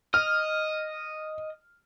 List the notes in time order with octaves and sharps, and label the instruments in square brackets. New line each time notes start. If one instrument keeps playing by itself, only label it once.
[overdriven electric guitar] D#5 [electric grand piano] F6